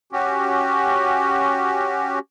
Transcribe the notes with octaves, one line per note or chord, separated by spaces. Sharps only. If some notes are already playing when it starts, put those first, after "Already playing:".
C#4 F#4 G4